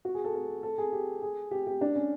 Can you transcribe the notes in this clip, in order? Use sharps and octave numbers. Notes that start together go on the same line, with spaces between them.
F#4
G#4
A4
A4
A4
G#4
G4
G#4
G4
G4
D4
C#4